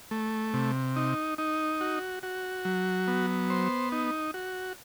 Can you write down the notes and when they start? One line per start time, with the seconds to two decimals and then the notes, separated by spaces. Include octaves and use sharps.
0.11 A3
0.54 C3
0.96 D#4
1.38 D#4
1.81 F#4
2.23 F#4
2.65 F#3
3.07 B3
3.50 C5
3.92 D#4
4.34 F#4